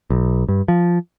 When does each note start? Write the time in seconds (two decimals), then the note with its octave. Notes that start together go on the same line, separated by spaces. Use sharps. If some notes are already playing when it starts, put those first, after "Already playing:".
0.10 B1
0.48 G2
0.68 F3